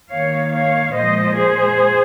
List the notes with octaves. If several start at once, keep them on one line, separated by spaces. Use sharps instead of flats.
D#3 A#3 C#5 F5
C#5 F5
A#2 F3 G#3 C5 D#5
G#4 C5